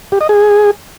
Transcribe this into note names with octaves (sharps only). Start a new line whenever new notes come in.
G4
D#5
G#4